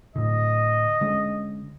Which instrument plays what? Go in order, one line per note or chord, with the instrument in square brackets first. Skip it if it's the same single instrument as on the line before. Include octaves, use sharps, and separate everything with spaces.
[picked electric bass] A2 D3 [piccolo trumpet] D#5
[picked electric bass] D3 G#3 C#4